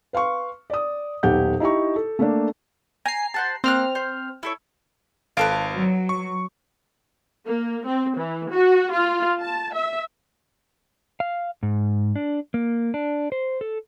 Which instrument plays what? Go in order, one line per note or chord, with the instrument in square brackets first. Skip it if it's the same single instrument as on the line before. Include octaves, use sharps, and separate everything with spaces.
[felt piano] B4 F5 C6 C#6
D5 D#6
D#1 B1 G4 F#5 G6
D#4 E4 G4 A#5 C#6
A4
A3 A#3 D4
[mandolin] G#5 [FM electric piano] A#5 C7
[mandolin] C5 F#5 A5
[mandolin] A#3 F#6 [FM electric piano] C4 F6
[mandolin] C5
E4 A4 C#5
[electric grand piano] G#1 F5 D7 [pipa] F4 A4 B4
[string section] F#3
[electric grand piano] C#6
[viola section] A#3
C4
E3
F#4
F4
A5
E5
[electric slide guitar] F5
G#2
D4
A#3
D4
C5
A4